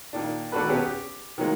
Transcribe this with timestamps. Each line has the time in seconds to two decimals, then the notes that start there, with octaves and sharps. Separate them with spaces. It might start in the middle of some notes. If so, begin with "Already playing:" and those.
0.13 A#2 D#3 D4
0.52 D#2 D4 F#4 A4 B4
0.69 B2 B3 C#4 G4 G#4
0.85 G4
1.38 D#3 F3 F#3 G#3 A#3